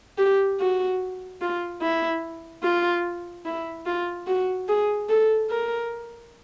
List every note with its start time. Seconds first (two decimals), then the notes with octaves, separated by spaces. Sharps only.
0.18 G4
0.60 F#4
1.42 F4
1.81 E4
2.63 F4
3.46 E4
3.86 F4
4.28 F#4
4.68 G#4
5.09 A4
5.50 A#4